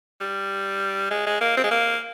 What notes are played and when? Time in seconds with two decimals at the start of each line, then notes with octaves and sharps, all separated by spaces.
0.20 G3
1.11 G#3
1.26 G#3
1.41 A#3
1.57 C4
1.64 G#3
1.71 A#3